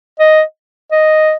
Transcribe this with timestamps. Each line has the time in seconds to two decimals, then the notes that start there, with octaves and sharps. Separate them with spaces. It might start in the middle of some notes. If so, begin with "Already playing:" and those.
0.20 D#5
0.92 D#5